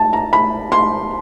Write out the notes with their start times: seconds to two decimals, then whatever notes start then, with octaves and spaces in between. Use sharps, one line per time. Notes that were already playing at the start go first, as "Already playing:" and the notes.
Already playing: A5
0.13 A#5
0.33 B5
0.72 C6